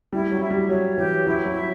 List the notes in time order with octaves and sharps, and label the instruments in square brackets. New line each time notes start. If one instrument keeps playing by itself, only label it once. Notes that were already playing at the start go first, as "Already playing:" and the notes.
[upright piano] G3 [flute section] E4
[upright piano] F#3
[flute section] E5
[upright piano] G3
[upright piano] F#3 [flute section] C#5
[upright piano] E3 [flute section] G4
[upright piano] F#3 [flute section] E4
[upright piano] F#3
[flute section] E5